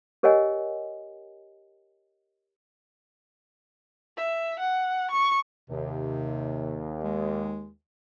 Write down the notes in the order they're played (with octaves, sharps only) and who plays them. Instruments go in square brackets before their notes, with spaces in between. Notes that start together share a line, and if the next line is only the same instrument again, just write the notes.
[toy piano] G4 A#4 C#5 D#5 F#5 G#5
[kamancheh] E5
F#5
C#6
[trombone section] D#2 [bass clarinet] C3
[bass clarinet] G#3